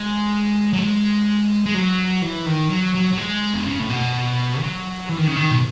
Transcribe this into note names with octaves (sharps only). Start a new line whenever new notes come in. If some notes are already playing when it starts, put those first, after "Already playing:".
Already playing: G#3
F#3
G#3
G#3
F#3
E3
D#3
F#3
F#3
F#3
G#3
B2
C#3
A2
B2
F#3
E3
D#3
C#3
D#3
B2